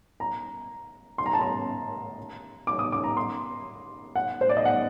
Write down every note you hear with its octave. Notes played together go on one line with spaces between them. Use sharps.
A#5
C6
A#5
A5
A#5
D6
D#6
D6
A#5
C6
F#5
C5
D5
D#5
F#5